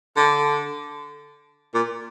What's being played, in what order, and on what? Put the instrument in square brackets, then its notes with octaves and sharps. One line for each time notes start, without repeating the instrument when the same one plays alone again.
[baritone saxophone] D3
A#2